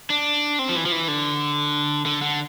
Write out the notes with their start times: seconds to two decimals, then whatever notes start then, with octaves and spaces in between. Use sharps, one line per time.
0.10 D4
0.59 C4
0.69 F3
0.75 E3
0.86 F3
0.92 E3
1.08 D3
2.06 D3
2.22 D3